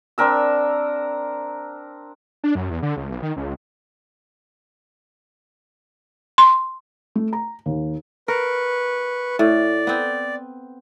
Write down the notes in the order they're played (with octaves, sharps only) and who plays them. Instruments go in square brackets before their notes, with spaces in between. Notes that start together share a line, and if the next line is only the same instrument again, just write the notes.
[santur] C4 D4 A#4 E6
[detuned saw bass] D4
F#2
E2
D3
C#2
B1
D#3
C#2
[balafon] C6
[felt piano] A3
A#5
D#2
[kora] A#4 [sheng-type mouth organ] B4 C#6
[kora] A2 [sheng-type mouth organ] D5
[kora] B3 C4